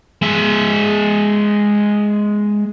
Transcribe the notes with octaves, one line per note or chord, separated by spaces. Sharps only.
G#3 E5